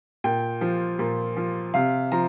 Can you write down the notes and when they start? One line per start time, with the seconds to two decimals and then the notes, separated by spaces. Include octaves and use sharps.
0.24 A#2 G5
0.61 F3
0.99 A#2
1.37 F3
1.74 C3 F5
2.12 F3 A#5